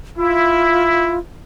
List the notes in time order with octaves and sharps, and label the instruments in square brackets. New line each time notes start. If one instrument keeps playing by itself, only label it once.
[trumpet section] E4 [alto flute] F4